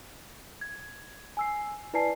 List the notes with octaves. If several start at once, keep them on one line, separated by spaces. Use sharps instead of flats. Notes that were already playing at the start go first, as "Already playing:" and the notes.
G#6
G#5 E6 C7
E4 B4 D5 G#5 A5 C7